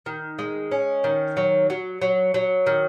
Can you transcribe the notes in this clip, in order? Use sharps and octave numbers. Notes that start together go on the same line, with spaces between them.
D#3
G#3
C#4
D#3
F#3
F#3
F#3
F#3
D#3